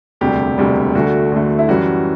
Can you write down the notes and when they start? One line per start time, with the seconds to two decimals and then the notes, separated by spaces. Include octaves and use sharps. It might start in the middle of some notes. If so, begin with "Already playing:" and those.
0.21 E1 D2 C3 G3 G4
0.58 E1 D2 C3 G3
0.95 D2 D3 A3 F#4
1.32 D2 D3 A3
1.59 E4
1.69 F#2 E3 G3 F#4